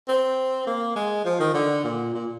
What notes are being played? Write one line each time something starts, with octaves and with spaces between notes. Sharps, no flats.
C4
A#3
G#3
F3
D#3
D3
A#2
A#2